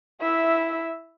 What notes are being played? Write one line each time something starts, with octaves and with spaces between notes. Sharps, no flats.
E4 E5